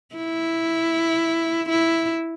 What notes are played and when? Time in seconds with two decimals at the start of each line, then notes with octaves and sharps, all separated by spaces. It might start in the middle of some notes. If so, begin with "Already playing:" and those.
0.15 E4
1.69 E4